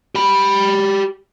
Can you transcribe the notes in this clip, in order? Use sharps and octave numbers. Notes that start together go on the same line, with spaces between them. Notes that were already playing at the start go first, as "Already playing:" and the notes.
G4 B5